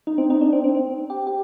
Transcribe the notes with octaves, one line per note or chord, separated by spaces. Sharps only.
D#4
C4
D#4
D4
C4
C4
C4
G4
G4